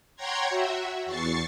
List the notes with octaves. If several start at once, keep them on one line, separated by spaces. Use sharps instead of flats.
C#5 F#5 G5 A#5 C6 G#6
F#4 E5
E2 C#6 A6 C7